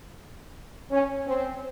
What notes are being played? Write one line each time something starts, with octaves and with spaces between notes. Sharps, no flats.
C#4
C4